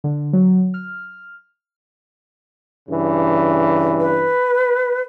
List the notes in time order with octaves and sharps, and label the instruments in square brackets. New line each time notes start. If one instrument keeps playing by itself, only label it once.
[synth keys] D3
F#3
F6
[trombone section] G2 C#3 E3
[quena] B4